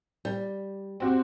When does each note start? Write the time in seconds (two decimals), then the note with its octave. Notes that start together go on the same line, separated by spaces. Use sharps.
0.25 G3
1.00 C4 F#4 G4